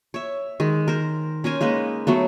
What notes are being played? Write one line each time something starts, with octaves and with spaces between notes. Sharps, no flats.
C#5 E5
D#3 G#3
A#4 C5
C#4 A#4 C5 G#5
G#3 A#3 D#4 B4
F#3 A3 B3